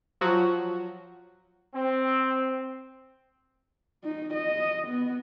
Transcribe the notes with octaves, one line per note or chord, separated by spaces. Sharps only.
F3 F#3 F#4
C4
D#4
D#5
B3